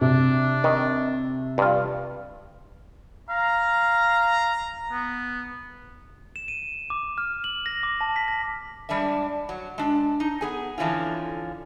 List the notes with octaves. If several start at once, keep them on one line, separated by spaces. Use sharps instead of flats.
C3 D4
D#3
G2 F4
F5 A#5
B3
E7
D#7
D6
F6
F#7
A#6
D6
A5
B6
A#6
G3 G#3 D4 E5
F#3
G#3 D4
D#4
B3 G#4 G#5
F2 D3 E3 F3 C#4 F4